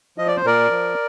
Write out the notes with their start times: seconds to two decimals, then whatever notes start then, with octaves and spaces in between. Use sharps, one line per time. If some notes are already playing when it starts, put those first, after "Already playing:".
0.18 F3 D#5
0.27 D5
0.37 C5
0.44 A#2 A#4 D5
0.70 F3